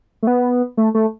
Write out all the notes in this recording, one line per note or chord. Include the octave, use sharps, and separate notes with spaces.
A3
B3
A3
A3